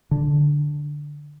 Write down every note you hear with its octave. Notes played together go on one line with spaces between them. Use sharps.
D3